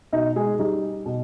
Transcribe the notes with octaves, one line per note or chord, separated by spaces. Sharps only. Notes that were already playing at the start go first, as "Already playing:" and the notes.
B2 D#4 D#5
G#3 G#4
G3 D#4
B2